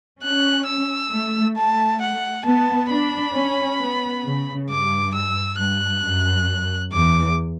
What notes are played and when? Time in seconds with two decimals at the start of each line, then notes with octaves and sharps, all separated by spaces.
0.22 C#4 F#6
0.67 E6
1.11 A3
1.56 A3 A5
2.01 F#5
2.45 B3 A5
2.91 D4 B5
3.35 C#4
3.80 B3
4.25 C#3
4.69 G2 D6
5.14 E6
5.59 G2 F#6
6.04 F#2
6.93 E2 D6